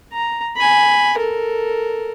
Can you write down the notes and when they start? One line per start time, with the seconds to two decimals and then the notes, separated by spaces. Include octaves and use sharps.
0.12 A#5
0.56 G#5 B5
1.18 A4 A#4